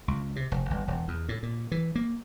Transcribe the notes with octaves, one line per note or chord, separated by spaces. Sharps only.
C#2
C3
F1
G1
E1
E2
A2
A#2
E3
A#3